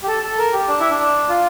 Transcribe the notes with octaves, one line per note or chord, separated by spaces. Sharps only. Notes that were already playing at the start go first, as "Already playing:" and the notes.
G4
A4
A4
A#4
G4
D4
E4
D4
F4